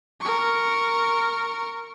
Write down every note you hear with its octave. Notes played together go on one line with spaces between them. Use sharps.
A#4 C#6